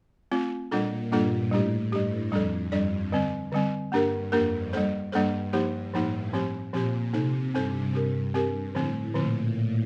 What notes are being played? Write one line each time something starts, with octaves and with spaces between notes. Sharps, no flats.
A3 C4 F4
A#2 G3 A#3 D4 F4 A4
G2 G3 A#3 D4 F4 A4
A2 G3 D4 G4
G2 G3 D4 G4
F2 G3 D4 A4 D5
G2 G3 D4 A4 D5
D3 G3 C4
D3 G3 C4
G2 A#3 D4 G4 A#4
F2 A#3 D4 G4 A#4
G3 A#3 D4 A4 C5
G2 G3 A#3 D4 A4 C5
G2 F3 A#3 D#4 G4
A2 F3 A#3 D#4 G4
F3 C4 G4 C5
A#2 F3 C4 G4 C5
C3 C4 D#4 A4 C5
G2 C4 D#4 A4 C5
G2 C4 G4 A#4
C4 G4 A#4
A2 D3 F3 C4
A#2 D3 F3 C4